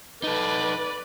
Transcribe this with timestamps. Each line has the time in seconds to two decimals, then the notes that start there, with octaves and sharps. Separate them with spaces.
0.23 D#4 A4 B4 D5